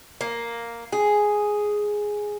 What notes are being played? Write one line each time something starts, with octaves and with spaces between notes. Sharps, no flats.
A#3
G#4